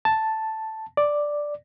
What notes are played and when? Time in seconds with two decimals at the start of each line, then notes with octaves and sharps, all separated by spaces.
0.05 A5
0.97 D5